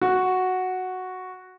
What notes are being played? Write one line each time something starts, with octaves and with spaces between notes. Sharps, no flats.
F#4